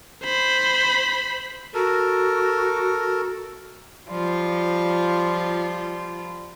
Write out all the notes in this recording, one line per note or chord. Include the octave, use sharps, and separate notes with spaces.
C5 B5
F#4 A4 A#4
F3 G3 F4